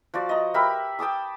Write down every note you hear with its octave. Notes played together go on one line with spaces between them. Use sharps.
F3 F#4 D5
D#5 A#5
G4 A#4 E5 B5
G5 A5 D6 D#6